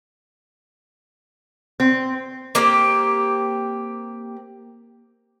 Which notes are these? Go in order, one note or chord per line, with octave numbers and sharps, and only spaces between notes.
C4
A#3 C4 G4